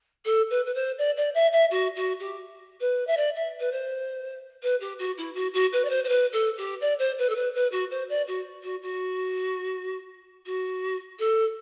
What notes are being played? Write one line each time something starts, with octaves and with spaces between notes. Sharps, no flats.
A4
B4
B4
C5
D5
D5
E5
E5
F#4
F#4
G4
B4
E5
D5
E5
B4
C5
B4
G4
F#4
E4
F#4
F#4
B4
D5
C5
C5
B4
A4
G4
D5
C5
B4
A4
B4
B4
F#4
C5
D5
F#4
F#4
F#4
F#4
A4